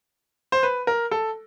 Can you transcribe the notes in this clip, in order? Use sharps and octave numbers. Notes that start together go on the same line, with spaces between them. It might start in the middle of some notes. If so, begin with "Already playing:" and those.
C5
B4
A#4
A4